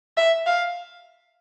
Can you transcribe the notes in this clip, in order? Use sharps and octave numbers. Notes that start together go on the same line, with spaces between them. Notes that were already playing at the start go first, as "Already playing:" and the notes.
E5
F5